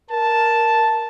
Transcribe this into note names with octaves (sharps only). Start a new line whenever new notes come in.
A#4 A5